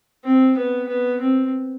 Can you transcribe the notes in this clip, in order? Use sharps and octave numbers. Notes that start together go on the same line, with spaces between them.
C4
B3
B3
C4